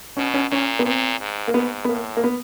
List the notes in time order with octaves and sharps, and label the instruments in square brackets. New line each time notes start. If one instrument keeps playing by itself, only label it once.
[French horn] B2 [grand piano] C#4
[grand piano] C#4
[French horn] A#2 [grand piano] C#4
[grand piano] B3
[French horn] A#2 [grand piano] C4
[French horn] G#2
[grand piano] A#3
[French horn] G#2 [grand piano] B3
[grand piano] B3
[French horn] A2 [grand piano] A#3
[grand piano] A#3
B3